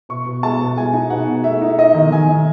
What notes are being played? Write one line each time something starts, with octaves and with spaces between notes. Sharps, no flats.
B2 C#6
B2
G#3 A5
B2
G#3 G#5
D#4
B2 F#5
B2
A3 E5
D#4
D#4 D#5
D#3
D#3 G#5
D#3